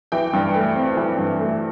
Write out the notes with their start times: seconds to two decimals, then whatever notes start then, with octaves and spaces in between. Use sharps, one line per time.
0.12 E3 G5
0.33 G2
0.55 A3
0.75 C4
0.97 E3
1.17 G2
1.39 A3